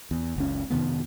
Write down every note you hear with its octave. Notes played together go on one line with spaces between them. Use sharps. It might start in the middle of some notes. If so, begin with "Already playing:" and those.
E2
F#1 C#2 C#4
F2 C3 D#3 B3